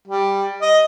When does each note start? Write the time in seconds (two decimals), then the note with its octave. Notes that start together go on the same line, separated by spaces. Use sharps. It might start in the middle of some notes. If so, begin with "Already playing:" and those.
0.08 G3
0.62 D#5